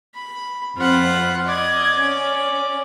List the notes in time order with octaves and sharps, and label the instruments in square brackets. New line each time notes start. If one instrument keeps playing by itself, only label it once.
[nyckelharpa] B5
[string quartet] F2 C4 B5 [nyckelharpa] F4 F#5
[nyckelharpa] D5 [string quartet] D#5 G#6
[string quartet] C#4